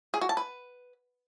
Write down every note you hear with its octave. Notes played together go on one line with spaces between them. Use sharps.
G#4
F#4
A5
B4